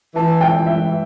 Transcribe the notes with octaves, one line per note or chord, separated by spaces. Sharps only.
E3 A5
G5
E3
E5